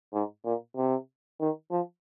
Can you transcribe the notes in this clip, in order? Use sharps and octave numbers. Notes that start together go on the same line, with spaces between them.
G#2
A#2
C3
D#3
F3